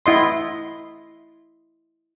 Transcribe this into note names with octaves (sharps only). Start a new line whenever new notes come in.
E4 D#5 C6